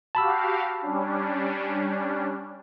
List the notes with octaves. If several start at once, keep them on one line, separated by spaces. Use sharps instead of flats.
F#4 G4 F5 A5 B5 E6
G3 C#4 D4